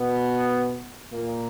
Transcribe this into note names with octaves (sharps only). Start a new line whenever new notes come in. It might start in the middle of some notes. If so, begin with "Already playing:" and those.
Already playing: B2 B3
A#2 A#3